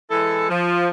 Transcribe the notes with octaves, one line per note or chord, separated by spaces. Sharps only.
E3 G#3 E4 A4
F3